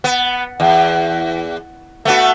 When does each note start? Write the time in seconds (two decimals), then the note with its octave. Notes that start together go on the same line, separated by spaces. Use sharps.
0.04 B3
0.60 E2
2.05 A3 B3 F#4